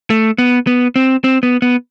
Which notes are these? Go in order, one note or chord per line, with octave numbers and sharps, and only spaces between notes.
A3
B3
B3
C4
C4
B3
B3